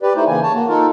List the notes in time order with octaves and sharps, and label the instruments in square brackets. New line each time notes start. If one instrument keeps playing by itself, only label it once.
[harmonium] G4 B4 D5
A3 D#4 E4 C5
C#3 E3 A#3 G#5
C#5 A5
A#3 F#4
D#4 F4 A4 A#4